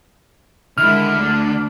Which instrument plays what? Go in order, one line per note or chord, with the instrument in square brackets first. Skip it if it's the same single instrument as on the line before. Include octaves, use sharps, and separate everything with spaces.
[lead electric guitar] D3 [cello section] D#3 G#3 E4 [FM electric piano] F6
[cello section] D2 D4